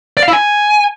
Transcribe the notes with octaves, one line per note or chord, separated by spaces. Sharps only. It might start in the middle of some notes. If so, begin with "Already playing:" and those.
D5
F5
E4
G#5